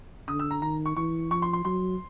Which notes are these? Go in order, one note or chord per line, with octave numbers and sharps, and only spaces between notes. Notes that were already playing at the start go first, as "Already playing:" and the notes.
D3 D#6
E6
A#5
D#3 A#5
C#6
E3 C#6
F3 C#6
C6
C6
F#3 C6